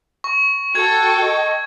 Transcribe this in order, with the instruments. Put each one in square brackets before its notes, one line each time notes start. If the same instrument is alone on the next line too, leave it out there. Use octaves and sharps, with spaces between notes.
[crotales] C#6
[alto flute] F#4 [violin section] A4 G5 C#6 [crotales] G#6
[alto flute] D#5